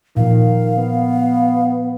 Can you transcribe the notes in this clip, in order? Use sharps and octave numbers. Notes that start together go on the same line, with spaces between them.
A#2 D#3 F3 F5
B3